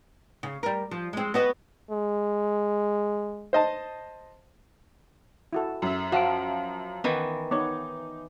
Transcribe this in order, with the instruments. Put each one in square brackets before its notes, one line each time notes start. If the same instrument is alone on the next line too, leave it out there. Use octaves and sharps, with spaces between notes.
[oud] C#3
G3 A#4
F3
G#3 C4
B3 F#4 D#5
[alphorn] G#3
[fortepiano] C5 D#5 A5
[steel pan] E4 F#4 A4
[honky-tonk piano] F#2 E5
[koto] F3 [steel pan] F#4 [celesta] F5 A5 D7
[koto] D#3 E3 [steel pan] B3
[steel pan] B3 C#5 [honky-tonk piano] D#4 [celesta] D6